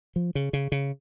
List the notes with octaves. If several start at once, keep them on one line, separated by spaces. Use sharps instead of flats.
F3
C#3
C#3
C#3